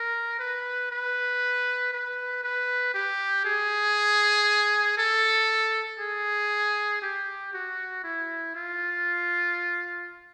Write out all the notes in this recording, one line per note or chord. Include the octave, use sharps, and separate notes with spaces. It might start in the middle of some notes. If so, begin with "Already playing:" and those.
Already playing: A#4
B4
B4
B4
B4
G4
G#4
A4
G#4
G4
F#4
E4
F4